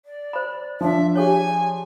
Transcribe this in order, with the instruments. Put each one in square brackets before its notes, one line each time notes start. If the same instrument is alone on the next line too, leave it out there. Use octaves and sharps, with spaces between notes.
[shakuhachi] D5
[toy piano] C5 B5
[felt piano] F3 D4 [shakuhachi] E5
[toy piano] G4 G#4 C#5 [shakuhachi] G#5